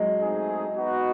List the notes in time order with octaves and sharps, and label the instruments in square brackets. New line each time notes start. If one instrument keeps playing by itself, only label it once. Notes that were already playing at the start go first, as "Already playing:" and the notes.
Already playing: [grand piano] F#3 G#3
[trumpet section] A3 C4 D#4 G#4
B3 D#4 F#4